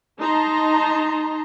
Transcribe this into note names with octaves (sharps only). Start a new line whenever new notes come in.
D#4 A5 A#5 C6